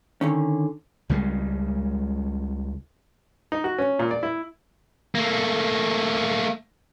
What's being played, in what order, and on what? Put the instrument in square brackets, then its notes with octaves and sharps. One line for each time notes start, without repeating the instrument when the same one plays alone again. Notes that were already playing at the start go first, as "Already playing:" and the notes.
[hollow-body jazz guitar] D3 D#3 C#4
[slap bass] C#2 C#3 G3 G#3
[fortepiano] D#4
F#4
C#4
A#2
D5
E4
[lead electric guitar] A3 A#3